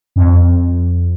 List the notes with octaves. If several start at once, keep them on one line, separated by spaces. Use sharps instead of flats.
F2